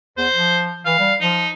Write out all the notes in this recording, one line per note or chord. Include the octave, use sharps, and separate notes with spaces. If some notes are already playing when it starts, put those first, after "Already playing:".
E2 C5
F3
E3 F5
G3
F3 D#4